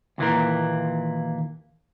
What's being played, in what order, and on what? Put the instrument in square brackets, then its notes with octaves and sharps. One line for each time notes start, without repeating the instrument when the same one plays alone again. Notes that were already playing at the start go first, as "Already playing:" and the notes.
[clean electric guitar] D#2 A#2 E3 A#3 A#4